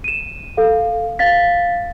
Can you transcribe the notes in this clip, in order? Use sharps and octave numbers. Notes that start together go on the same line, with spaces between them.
D#7 E7
A4 F5
F5 A6 B6